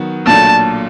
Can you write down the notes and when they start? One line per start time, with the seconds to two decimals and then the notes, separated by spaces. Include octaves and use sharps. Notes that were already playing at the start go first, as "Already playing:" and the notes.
Already playing: D#3 F#3 B3 F#4
0.27 B1 A#2 F#3 A3 D4 A5